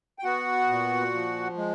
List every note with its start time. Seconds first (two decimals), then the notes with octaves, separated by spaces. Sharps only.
0.19 G5
0.24 B3 F#4 F#5
0.69 A#2
1.14 F3
1.57 G#3